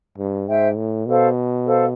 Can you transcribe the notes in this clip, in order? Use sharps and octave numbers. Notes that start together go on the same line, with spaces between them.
G2
G#2 C5 E5 G5
A2
B2 A4 C5 F5
A4 C5 F5